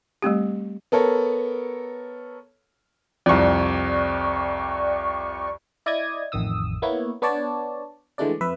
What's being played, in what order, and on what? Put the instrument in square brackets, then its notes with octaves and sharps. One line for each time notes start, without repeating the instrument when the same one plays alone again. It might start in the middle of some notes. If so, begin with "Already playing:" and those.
[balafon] G3 A3 C4 G4
[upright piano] B3 A4 A#4 C#5
[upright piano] C2 F2 [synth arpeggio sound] D5 C#6
[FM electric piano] E4 D5 D#5 D#6 G#6
A1 F2 D#3 D#6 E6
A#3 B3 E4 C#5
B3 D4 C#5 D5 A5
D3 E3 G#3 A3 D4 D5
F2 B4 E5